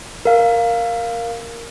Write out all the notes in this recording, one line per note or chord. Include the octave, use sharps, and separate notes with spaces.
A#4 F5